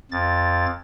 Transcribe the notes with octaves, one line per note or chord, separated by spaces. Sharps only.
F2 A6